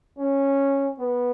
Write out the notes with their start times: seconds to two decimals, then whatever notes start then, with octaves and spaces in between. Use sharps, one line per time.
0.18 C#4
0.99 B3